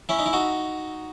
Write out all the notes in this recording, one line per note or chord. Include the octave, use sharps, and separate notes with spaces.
C#4 E4
D#4
E4
D#4 F#4